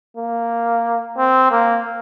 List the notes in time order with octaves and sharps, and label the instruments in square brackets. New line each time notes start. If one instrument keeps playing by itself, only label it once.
[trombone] A#3
C4
A#3